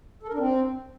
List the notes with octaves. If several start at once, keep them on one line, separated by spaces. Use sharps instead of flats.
A4
A#4
D4
C4